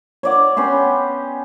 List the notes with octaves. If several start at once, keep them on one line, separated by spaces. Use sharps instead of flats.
C#5 D5 F#5
B3 C#4 G4 C6